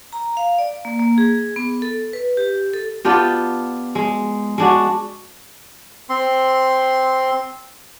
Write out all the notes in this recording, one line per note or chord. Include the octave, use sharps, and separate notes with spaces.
A#5
F5
D5
A#3
A#3
G#4
B3
A4
B4
G4
A4
B3 D4 F4 G4
G#3
G#3 D4 F#4
C4 C6